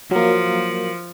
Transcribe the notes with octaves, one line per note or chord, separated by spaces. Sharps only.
F3 F#3 A#3